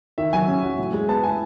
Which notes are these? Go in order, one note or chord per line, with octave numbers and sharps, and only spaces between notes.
D#3 E5
F#3 G#5
C#4
F#4
A2
G#3
B3 A5
E4 G#5